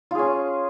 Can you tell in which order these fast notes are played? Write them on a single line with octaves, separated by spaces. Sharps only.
F4 G#4 C#4